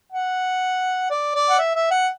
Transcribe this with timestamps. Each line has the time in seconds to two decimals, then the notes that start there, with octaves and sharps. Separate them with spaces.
0.12 F#5
1.10 D5
1.35 D5
1.50 F#5
1.58 E5
1.75 E5
1.91 F#5